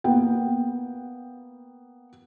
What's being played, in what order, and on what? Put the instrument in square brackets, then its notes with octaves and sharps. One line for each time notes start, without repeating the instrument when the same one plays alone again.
[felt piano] A#3 B3 G5